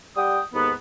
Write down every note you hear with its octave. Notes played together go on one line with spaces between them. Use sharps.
G3 F#5 G5 D#6
D#2 G#2 B3